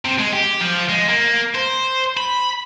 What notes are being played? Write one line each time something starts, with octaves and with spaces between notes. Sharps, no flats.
C3
G#3
G4
F3
G#3
A#3
C5
B5